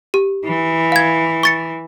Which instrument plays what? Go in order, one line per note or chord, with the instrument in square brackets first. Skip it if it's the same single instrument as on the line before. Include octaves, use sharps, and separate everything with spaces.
[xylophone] G4
[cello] E3
[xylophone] F5 G#6
C#6 A6 C#7